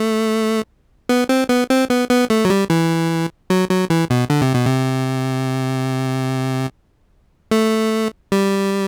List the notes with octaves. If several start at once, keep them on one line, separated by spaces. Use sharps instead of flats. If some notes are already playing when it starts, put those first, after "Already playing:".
Already playing: A3
B3
C4
B3
C4
B3
B3
A3
F#3
G3
E3
F#3
F#3
E3
B2
D3
C3
B2
C3
A3
G3